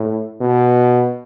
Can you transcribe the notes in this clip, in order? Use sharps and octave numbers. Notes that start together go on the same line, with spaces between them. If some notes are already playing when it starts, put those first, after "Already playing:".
Already playing: A2
B2